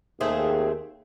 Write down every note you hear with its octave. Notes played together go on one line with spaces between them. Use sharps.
D#2 A3 C4 G#4